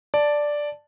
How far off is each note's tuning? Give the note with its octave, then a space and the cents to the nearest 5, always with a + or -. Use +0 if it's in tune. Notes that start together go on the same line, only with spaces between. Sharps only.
D5 +0 A5 +0